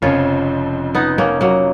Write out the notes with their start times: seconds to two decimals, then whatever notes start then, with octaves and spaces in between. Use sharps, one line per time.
0.02 F1 F2 C#3 F3 C#4 F4
0.94 B3 D#4
1.18 A#3 C#4
1.41 F#3 A#3